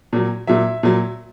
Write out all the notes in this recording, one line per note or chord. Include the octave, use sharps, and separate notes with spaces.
A#2 F#3
A#2 F#3 E5
A#2 F#3